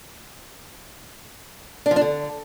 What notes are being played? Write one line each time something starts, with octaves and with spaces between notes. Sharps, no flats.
D4
F3
D4
D3